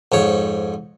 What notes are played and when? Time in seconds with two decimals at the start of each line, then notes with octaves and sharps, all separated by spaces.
0.12 F2 G#2 C#5